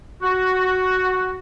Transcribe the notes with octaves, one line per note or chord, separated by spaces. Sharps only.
F#4